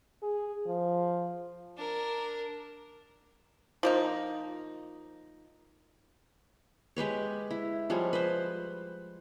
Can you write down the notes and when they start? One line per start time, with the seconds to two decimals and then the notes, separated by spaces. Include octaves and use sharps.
0.23 G#4
0.66 F3
1.77 D4 A#4
3.83 F3 A#3 D#4
6.96 G#3 G4 B4 C#5
7.51 E4
7.90 F3 G3 G#3 C#5
8.13 B4 C5